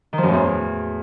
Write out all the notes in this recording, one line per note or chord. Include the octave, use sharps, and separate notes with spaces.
D#3
F3
F#2
A2
E2